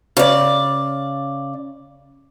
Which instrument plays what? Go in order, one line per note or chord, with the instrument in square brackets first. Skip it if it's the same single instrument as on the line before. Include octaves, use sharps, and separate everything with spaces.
[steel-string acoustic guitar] C#3 D5